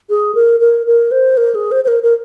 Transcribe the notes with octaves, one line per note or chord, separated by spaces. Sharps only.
G#4
A#4
A#4
A#4
C5
A#4
G#4
C5
C5
A#4
A#4